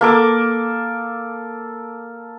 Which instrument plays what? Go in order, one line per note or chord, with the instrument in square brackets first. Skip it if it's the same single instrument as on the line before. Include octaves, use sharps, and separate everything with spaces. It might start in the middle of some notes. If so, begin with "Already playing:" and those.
[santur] A#3 A4 D6